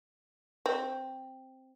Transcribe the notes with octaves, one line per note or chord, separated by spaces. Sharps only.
C4